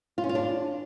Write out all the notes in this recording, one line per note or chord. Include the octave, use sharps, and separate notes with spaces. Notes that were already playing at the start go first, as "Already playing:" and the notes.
F4
C#4
F4
D4